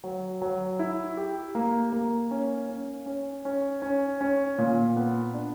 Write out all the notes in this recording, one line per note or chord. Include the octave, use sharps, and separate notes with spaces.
F#3
F#3
E4
G4
A#3
A#3
C#4
C#4
C#4
C#4
C#4
C#4
A#2
B3
D4